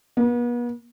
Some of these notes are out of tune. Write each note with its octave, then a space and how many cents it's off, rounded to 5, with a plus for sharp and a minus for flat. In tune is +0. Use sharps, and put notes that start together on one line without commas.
B3 -40